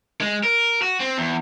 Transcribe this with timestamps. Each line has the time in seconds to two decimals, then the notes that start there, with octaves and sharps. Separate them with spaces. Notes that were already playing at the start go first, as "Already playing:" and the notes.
0.21 G#3
0.43 A#4
0.82 F#4
1.00 C4
1.18 E2